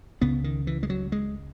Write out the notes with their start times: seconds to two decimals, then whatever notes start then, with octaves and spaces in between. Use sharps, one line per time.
0.21 C#2 C#3 B3
0.44 D#3
0.67 E3
0.83 G#3
0.90 F#3
1.12 G#3